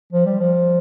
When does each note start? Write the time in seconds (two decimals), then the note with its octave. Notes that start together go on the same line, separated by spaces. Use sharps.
0.13 F3
0.26 G3
0.40 F3